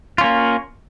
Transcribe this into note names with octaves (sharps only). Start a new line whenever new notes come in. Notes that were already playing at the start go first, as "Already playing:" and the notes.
A#3 C#4 F4